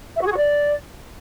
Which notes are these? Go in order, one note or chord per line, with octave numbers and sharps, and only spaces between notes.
E5
F#4
G#4
F#4
D5